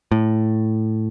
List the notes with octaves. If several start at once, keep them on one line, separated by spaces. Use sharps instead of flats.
A2